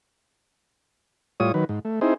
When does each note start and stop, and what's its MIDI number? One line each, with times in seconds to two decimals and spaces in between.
1.40 1.52 45
1.40 1.52 55
1.40 1.52 65
1.40 1.52 73
1.40 1.52 87
1.54 1.65 51
1.54 1.65 54
1.54 1.65 71
1.69 1.79 44
1.85 2.00 57
2.01 2.14 60
2.01 2.14 63
2.01 2.14 64
2.01 2.14 68
2.01 2.14 72